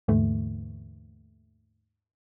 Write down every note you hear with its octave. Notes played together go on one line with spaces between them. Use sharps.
D#2 G#2 D3 E3 A3